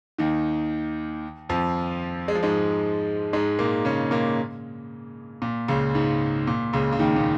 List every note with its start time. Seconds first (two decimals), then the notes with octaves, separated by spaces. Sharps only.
0.18 D#2 D#3
1.49 F2 F3
2.28 G#3
2.35 F3
2.43 G#2 G#3
3.33 G#2 G#3
3.59 A#2 A#3
3.85 C#3 C#4
4.11 A#2 A#3
5.42 A#2
5.68 C#2 C#3
5.95 G#2
6.47 A#2
6.73 C#2 C#3
6.93 C#3
6.99 D#2 D#3
7.16 A#2